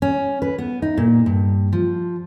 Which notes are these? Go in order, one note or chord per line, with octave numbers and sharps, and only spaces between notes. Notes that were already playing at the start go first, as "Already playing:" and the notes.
C#4
B4
B3
D#4
A#2
G2
F3